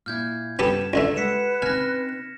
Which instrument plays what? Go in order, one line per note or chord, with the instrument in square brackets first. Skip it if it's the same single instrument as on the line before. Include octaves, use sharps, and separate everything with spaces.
[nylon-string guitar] A#2 E4 [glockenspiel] F6 G6 G#6
[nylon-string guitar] G2 C#4 A5 [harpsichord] B3 G4 A4 [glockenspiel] E7
[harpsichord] C#2 D3 A3 [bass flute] A4
[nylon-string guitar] G#3 G4 F#5 [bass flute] B4 [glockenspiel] B6 C#7 E7
[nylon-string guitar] C4 C#4 D#4 [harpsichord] G#5 [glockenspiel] F6 A#6